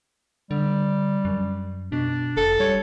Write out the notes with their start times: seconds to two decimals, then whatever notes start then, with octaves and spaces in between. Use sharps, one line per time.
0.51 D3 G3
1.25 F#2
1.92 B2 D4
2.37 F1 A4
2.60 G3 C#5